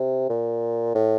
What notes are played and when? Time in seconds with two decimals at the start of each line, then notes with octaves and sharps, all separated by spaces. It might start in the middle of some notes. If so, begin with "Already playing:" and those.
Already playing: C3
0.29 A#2
0.95 A2